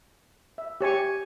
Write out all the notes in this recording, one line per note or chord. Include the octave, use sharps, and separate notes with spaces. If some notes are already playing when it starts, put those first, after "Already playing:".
E5
G4 C#5 G#5 C#6